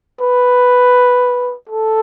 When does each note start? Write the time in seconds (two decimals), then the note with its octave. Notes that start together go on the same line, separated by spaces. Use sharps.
0.21 B4
1.69 A4